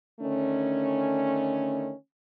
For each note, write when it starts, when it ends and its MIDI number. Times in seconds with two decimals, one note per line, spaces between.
0.20 1.92 50
0.20 1.92 51
0.20 1.92 57
0.20 1.92 61